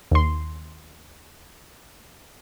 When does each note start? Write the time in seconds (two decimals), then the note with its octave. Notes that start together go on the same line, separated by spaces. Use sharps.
0.11 D#2 C6